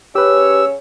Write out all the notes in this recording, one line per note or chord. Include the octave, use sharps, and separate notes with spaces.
C#3 C#4 G4 B4 C#5 E6